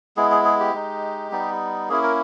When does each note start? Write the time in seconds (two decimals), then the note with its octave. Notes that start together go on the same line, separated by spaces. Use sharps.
0.17 G#3 B3 E4 G#4
0.31 G#4
0.45 G#4
0.60 G4
0.74 G#3 D#4
1.32 G3 B3 D#4
1.89 A#3 C#4 E4 G#4
2.03 A#4